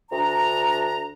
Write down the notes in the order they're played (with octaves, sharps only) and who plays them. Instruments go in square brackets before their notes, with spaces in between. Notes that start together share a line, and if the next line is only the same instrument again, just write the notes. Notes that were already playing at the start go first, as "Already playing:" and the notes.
[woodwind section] D2 D4 A#5